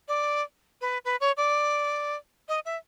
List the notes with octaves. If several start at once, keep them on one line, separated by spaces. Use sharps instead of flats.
D5
B4
B4
C#5
D5
D#5
E5